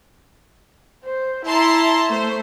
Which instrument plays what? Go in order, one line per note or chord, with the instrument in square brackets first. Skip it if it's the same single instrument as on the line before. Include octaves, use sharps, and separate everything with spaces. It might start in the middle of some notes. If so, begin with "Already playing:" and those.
[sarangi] C5
[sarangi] E4 [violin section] A5 A#5 C6
[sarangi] A3 [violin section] C5